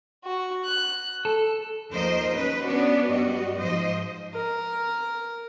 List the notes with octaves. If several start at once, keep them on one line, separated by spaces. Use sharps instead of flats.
F#4
F#6
A4
D#2 F3 A#4 C5 D#5
C#4 B4
B3 C#4 D4 F#4 D5
G2 G3 F#4 D#5
G#2 F3 C5 D#5
A#4